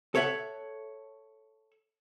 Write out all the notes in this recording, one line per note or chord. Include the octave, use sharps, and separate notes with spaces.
A4 C#5 E5 F#5